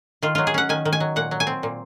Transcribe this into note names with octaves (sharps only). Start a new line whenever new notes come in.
D#3 F4
F#3 F4
G#4
C#4 F#5
D#3 G#5
D#3
G#5
F#3
A#2 F#5
F#3
G#5
C4
A#2